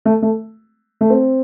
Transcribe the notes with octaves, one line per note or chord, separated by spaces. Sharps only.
A3
A3
A3
C4